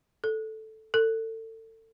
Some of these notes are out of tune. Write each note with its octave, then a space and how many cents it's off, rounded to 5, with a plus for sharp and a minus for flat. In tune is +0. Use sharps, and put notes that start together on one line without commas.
A4 -5
A4 +30